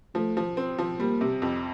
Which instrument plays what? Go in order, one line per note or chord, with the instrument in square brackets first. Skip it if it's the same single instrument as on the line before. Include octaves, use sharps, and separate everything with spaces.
[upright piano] F3 [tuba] A3
[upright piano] F3
C4
F3
[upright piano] G3 [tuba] A#3
[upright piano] C3
F2